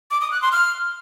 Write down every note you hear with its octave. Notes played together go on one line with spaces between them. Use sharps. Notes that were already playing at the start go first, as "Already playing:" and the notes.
D6
D#6
F#6
C6
F6